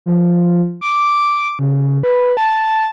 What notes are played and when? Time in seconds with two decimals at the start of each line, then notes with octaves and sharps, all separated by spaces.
0.06 F3
0.81 D6
1.59 C#3
2.03 B4
2.37 A5